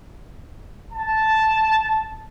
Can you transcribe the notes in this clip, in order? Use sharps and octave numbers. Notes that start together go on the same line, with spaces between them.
A5